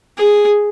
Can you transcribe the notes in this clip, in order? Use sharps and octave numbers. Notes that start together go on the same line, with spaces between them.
G#4